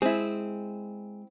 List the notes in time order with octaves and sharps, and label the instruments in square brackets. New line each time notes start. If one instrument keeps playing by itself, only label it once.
[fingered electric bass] G#3 [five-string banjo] C4 E4 [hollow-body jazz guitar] G#4